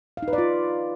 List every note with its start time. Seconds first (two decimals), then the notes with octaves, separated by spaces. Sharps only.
0.17 F5
0.22 D#4
0.28 B4
0.33 D5
0.38 F4